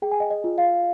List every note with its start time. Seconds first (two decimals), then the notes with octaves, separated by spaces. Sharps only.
0.02 G#4 G5
0.11 G#5
0.20 D#5 G5
0.31 D#5
0.44 F4
0.58 F5